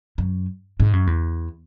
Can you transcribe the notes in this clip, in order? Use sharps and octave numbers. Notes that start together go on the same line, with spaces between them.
F#2
G#2
F#2
E2